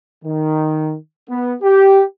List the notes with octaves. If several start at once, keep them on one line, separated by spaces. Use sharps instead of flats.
D#3
B3
G4